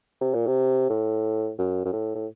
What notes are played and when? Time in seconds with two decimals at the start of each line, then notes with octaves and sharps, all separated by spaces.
0.21 C3
0.34 A#2
0.47 C3
0.90 A2
1.59 F#2
1.85 F#2
1.93 A2
2.15 A2